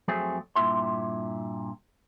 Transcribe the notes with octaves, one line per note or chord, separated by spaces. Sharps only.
F2 F#3 A3 C4 G#4
G2 A#2 D#4 E4 E5 C6